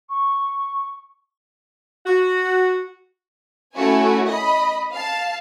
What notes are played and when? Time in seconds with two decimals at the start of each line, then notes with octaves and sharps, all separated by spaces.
0.09 C#6
2.06 F#4
3.74 A3 C#4 E4 F#4 G#5
4.27 D#5 B5
4.93 F5 A5